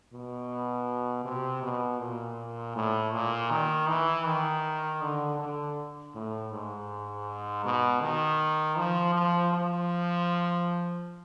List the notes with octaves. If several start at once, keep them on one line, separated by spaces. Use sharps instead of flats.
B2
C3
B2
A#2
A2
A#2
D#3
E3
D#3
D3
D3
A2
G#2
B2
D#3
F3
F3
F3